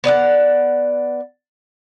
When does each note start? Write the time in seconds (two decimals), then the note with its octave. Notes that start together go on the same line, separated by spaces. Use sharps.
0.04 B3 D5 D#5 F#5